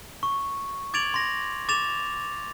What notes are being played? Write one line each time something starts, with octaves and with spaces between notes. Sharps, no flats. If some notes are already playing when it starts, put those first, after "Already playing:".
C#6
D6 G#6 A6 D7 F7 F#7
C6 A#6
D6 A6 E7 F7